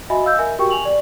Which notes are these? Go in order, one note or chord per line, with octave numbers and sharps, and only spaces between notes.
F#4 D#5 E5 G#5 B5
D#5 F5 E6 G6
A#4 E5 G#5
F#4 G4 A#4 G5 C#6
G#5 F7 F#7
D5